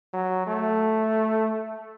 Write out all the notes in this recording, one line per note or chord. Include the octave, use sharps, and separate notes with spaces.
F#3
A3